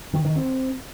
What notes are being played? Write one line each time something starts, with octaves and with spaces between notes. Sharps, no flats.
D#3
D#3
C4